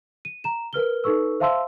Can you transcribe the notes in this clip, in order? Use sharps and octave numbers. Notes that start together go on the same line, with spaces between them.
D#7
A#5 E7
A#4 B4 F6 G7
D#4 A4 B4 C#6 E6
C5 E5 F5 A5 C6 E6